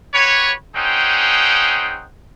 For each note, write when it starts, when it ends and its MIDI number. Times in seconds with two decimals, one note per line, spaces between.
0.14 0.53 66
0.14 0.53 67
0.14 0.53 71
0.14 0.53 73
0.75 2.06 60
0.75 2.06 61
0.75 2.06 63
0.75 2.06 68
0.75 2.06 78
0.75 2.06 79